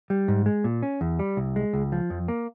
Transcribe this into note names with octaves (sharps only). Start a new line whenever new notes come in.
G3
G#2
G#3
A#2
C#4
E2
G3
C2
G#3
C#2
F3
F2
A#3